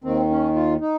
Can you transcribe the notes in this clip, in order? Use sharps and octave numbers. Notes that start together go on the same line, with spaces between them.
D#2 D#3 C4
C#4
F4
D#4